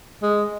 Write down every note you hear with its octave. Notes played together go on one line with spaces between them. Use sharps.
G#3